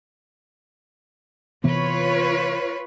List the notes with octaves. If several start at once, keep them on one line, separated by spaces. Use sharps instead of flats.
C3 E3 B3 F4 B4 C#5